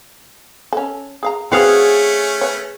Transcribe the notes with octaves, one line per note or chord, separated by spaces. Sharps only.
C#4 A4
G#4 F5 A#5
A3 C4 C#4 F#4 G#4 B4 F5 F#5
B4 C#5